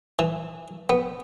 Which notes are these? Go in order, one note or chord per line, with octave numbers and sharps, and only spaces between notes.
E3
B3